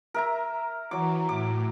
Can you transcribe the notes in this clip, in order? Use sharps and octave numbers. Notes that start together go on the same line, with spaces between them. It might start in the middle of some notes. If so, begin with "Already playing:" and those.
A#4 E5 A#5
E3 F#3 D6
A2 D6